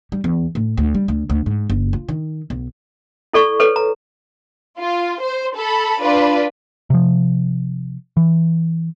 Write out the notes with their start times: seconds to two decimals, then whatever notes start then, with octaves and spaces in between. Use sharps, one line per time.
0.12 G3
0.24 E2
0.55 A2
0.78 D2
0.95 G3
1.08 D2
1.30 D2
1.46 G#2
1.70 F#1
1.93 F4
2.09 D#3
2.50 B1
3.33 E4 A4 D5 C#6
3.59 A4 B4 C#5
3.76 A#5
4.79 F4
5.21 C5
5.57 A4 B5
6.00 D4 F4 B4 D5
6.90 C3 F3
8.17 E3